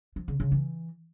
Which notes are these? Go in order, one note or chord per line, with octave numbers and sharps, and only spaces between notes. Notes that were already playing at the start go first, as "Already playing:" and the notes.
F3
C#3
C#3
E3